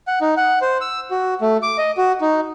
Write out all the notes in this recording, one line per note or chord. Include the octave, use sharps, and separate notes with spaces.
F#5
D#4
F#5
C5
E6
F#4
A3
D6
D#5
F#4
D#4